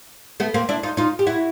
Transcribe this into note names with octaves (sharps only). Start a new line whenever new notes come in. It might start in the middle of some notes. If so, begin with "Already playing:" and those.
A3 B3
A#3 C4
D4 E4
D#4 F4
D#4 F4
G4
E4 F#4